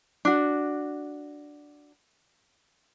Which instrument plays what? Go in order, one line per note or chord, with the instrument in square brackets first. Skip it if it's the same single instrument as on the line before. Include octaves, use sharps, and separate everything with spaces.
[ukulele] D4 F#4